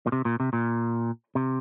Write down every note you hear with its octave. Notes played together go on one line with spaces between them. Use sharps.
A#2
C3
A#2
C3
A#2
C3